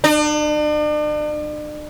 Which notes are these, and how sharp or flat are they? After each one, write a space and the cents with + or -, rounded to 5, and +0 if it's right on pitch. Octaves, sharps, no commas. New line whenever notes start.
D4 +40